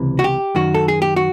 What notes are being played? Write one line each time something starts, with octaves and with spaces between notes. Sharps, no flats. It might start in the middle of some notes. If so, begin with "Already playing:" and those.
Already playing: C#2 C3 E3
F#4
G4
F#2 D#3 F#4
A4
G#4
G4
F#4